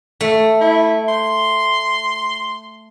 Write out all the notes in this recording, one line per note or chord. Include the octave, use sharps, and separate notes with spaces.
A3
E4
C6